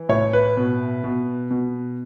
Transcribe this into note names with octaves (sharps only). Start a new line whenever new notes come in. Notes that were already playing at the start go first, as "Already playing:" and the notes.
Already playing: E3
A2 C#5
B4
B2
B2
B2